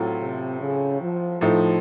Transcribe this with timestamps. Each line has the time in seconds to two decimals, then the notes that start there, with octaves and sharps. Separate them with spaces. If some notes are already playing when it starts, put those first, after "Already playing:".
Already playing: A2 F#3 C4 F4 A4
0.21 C3
0.61 C#3
1.01 F3
1.41 A2 F3 A3 D#4 A4